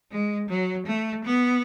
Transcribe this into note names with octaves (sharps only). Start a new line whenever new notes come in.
G#3
F#3
A3
B3